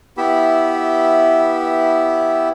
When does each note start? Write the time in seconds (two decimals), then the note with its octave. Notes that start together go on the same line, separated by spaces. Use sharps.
0.17 B3 E4 G4 E5 B5